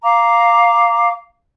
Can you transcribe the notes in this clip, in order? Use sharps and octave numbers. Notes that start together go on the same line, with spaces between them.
F5 A#5 D6